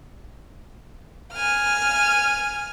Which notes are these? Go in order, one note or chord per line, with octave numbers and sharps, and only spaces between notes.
G#5 F6